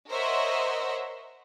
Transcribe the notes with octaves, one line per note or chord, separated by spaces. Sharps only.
A#4 C5 C#5 D#5 E5 F#5